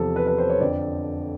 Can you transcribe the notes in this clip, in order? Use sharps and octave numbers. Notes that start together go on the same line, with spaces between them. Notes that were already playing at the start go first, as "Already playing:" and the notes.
Already playing: E2 C3 F3 A4
B4
B4
C5
C#5
F2 D3 F3 D5